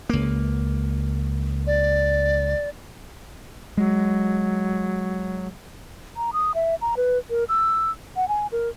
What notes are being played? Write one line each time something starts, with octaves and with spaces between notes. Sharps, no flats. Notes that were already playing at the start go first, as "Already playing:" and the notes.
C#2 A#3
D5
F#3 G#3
A#5
D#6
E5
A#5
B4
A#4
E6
F#5
G#5
A#4